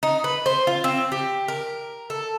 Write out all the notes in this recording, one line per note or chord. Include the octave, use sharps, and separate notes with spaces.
D#4
B4
C5
F4
C4
G4
A#4
A4